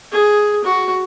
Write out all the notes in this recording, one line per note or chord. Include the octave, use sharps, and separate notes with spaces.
G#4
F#4